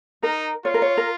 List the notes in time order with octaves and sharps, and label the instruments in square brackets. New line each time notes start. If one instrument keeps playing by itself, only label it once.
[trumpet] D#4 [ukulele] A#4
[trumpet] F4 [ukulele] C#5
[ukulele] A#4
C#5
A#4